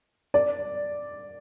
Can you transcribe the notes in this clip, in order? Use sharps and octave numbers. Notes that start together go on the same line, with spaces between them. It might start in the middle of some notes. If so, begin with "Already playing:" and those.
D5